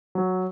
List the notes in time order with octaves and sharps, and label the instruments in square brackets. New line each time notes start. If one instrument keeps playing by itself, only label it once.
[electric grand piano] F#3